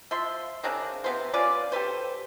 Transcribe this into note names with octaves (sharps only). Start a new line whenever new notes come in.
F3 E5 C6
C#3 C4 D4 A#4
C3 B3 C5
C#4 F4 B4 D5
G4 A4 B4 C5